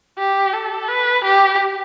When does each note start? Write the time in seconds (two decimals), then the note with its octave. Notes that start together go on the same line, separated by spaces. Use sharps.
0.18 G4
0.53 A4
0.89 B4
1.25 G4